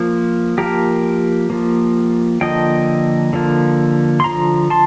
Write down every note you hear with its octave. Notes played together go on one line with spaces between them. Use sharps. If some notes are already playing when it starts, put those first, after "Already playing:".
Already playing: F3 A#3
F3 A#3 G4 A#4
F3 A#3
D3 F3 A#3 D#5 G5
D3 F3 A#3
C6
D3 F3 A#5
A5 C6